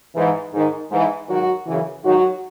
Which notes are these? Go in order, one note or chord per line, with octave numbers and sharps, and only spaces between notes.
G#2 E3
G#2 D#3
G#2 E3
G#2 D#3 F#3 F#4
F#2 C#3 E3
G#2 D#3 F#3 F#4